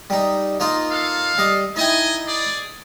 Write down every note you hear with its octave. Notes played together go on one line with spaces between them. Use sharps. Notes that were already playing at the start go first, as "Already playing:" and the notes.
G3 D#4
A#3 D#4 F4
A4 F5
G3 D#5
D#4 E4 D#5 G5 G#5
G#4 D5